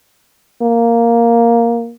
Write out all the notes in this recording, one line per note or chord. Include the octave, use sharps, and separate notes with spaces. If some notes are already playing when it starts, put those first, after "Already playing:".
A#3